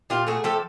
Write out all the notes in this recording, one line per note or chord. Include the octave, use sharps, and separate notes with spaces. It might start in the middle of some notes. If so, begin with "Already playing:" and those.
A#2 F4 G4
A3 F#4 G#4
F3 G4 A4